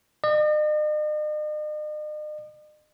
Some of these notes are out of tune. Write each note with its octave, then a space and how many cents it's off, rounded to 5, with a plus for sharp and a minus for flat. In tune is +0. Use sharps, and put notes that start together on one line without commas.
D#5 -45